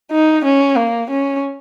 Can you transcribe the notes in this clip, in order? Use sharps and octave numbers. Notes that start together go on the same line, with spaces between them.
D#4
C#4
A#3
C#4